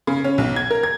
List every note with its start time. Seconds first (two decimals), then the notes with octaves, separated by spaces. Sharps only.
0.07 C#3
0.24 C#4
0.38 B1
0.56 G#6
0.70 A#4
0.83 G#6